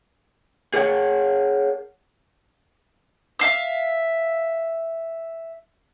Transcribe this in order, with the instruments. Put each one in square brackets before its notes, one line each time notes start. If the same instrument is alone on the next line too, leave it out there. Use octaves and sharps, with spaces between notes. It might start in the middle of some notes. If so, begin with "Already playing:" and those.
[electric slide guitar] G#4 A#4 C#5 F#5
[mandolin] E5 F5 E6